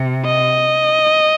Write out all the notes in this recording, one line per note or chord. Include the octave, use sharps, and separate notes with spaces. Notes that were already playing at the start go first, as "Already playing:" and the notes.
Already playing: C3
D#5